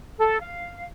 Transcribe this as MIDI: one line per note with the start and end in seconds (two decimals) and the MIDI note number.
0.19 0.38 69
0.42 0.85 77